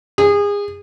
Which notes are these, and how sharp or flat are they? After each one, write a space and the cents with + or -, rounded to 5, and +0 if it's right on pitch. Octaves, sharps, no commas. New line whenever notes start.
G#4 -30